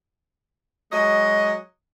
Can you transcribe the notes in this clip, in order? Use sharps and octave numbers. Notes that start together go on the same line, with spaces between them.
F#3 G#3 D#5